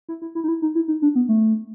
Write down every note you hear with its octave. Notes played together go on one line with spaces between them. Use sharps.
E4
E4
E4
D#4
E4
D#4
E4
D#4
D4
B3
A3